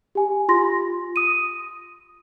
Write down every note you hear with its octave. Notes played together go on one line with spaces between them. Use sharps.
G4 G#5
F4 C6 A#6
D#6 D#7